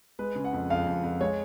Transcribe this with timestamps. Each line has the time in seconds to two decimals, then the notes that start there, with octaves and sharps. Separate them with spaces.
0.19 G#3 B4
0.35 C#3
0.44 F#5
0.53 F2
0.70 F2 F5
0.87 F2
1.03 F2
1.21 G#3 C#5